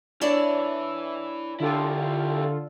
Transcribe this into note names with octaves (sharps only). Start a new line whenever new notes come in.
D4 E4 B4 C#5 D5
D3 E4 F4 G4 A4